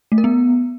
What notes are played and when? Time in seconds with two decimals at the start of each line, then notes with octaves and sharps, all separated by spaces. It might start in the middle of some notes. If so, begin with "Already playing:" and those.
0.12 A3
0.18 A#4
0.24 B3